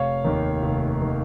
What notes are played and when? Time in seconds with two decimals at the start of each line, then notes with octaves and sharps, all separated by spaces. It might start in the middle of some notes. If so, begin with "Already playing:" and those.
Already playing: F1 C#5 F5
0.24 D#2 D#3
0.62 F1
1.02 D#3